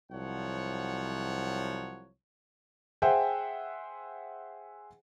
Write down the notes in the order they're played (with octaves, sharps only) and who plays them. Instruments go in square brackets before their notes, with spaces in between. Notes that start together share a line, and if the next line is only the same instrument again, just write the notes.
[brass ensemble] C2 F3 F#3 C#5 F#5
[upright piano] G#4 C5 E5 F#5 G5